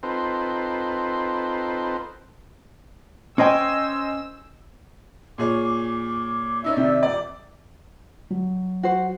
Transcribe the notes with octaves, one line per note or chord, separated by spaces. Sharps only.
C4 D#4 F4 A4 B4 C5
C#4 C5 D#5 G5 G#5 E6
A#2 G#4 C#5 D6
C#4 D#4 E4 D5 E5 E6
C3 D#3
D#1 D5 D6
F#3
F#4 C5